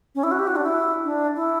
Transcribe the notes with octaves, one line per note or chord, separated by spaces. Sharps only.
C#4
E4
F#4
G4
F#4
D4
E4
D4
E4